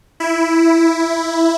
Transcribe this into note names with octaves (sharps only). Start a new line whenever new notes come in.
E4